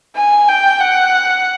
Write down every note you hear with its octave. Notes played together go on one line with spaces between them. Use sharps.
G#5
G5
F#5